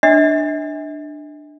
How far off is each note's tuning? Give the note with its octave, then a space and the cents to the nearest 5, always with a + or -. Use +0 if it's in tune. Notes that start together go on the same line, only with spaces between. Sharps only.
D4 +15 E5 -45